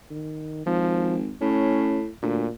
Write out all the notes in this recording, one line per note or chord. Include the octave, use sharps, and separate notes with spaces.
D#3
G#1 F3
A2 C#4
D2 A#2